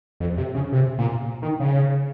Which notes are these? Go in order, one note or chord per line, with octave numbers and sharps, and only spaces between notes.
F2
C3
C#3
C3
A#2
D#3
C#3